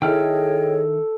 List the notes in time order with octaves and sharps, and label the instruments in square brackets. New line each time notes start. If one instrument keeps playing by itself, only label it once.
[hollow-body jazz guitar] D#3 E4 [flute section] G#4 C#5 D#5 [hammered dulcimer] A4 [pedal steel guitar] G5 F6